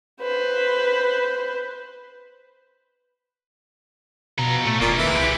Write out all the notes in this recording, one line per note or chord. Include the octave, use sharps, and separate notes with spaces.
B4 C5
B2 F3 A#5
A2 A3
E1 A#2 D#3 A#3
E3
C2 G#3 G4